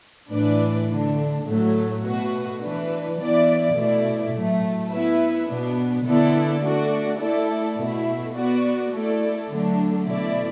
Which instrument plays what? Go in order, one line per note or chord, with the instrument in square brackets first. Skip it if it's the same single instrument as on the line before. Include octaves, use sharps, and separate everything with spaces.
[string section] A2 E3 D4 B4 D5
D3 A3 D4
A2 F#3 A3
B2 A3 F#4 B4
E3 D4 B4
E3 B3 E4 D5
B2 A3 E4 D5
A2 F#3 A3
B3 E4 B4 E5
B2 B3 D4
D3 B3 E4 A4 D5
A3 D4 F#4 D5
A3 E4 A4 D5
B2 A3 E4
B3 F#4 D5
A3 E4 A4 D5
D3 F#3 A3 D4
B2 A3 E4 D5